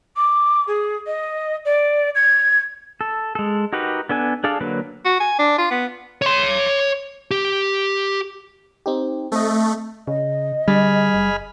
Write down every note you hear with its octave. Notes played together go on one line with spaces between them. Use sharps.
D6
G#4
D#5
D5
G#6
A4
G#3 A4
D#4 F#4 G4 A#4 B4
B3 D4 A4 G#5
D4 G#4 A4 D5 F5
D3 F#3 A#3 B4
F#4
G#5
D4
F4
B3
C#5 C6
G4
C4 D#4 G4
A3 C4 D#5
C#3 D#5
D3 G3 G#4 B5 F6
F#1